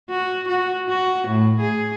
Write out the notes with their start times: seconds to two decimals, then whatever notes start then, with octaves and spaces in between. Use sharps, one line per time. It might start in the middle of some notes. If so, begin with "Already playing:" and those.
0.10 F#4
0.48 F#4
0.89 F#4
1.28 A2
1.60 G#4